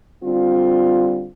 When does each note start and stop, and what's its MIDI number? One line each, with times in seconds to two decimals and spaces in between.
0.24 1.28 50
0.24 1.28 55
0.24 1.28 60
0.24 1.28 65